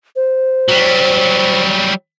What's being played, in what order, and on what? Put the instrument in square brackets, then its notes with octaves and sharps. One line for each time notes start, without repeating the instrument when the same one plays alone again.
[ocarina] C5
[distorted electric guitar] F#3 G3